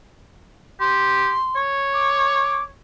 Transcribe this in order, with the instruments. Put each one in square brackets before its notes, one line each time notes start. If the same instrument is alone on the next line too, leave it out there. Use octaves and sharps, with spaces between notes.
[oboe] G4 [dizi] C6
[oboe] C#5
[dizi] D6